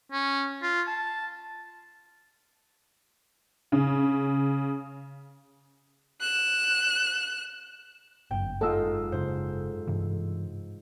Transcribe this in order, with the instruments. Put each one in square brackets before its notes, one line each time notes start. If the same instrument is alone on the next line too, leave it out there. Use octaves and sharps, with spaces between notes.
[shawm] C#4
F4
A5
[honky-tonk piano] C#3
[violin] F#6 E7
[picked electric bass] G1 F#2 [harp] G5
[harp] G#2 G#3 F4 [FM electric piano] A4 E6
[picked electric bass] F#1 F#2 C#3 [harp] C5
[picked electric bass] G2 C3 E3